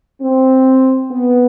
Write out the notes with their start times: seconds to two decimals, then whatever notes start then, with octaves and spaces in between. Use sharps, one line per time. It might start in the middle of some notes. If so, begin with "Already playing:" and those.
0.21 C4
1.10 B3